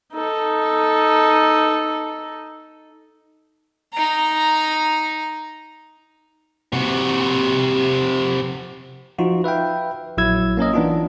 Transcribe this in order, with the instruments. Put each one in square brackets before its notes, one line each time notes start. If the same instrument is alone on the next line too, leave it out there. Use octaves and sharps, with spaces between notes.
[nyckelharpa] D#4 A4
[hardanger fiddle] D#4 A#5
[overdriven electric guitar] C3 F#4
[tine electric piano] F3 D#4 F4 F#4
B4 E5 F5 G5
A#1 F#3 E4 E6 G#6
A#3 C#4 A#4 D#5
E3 B3 D4 D#4 F4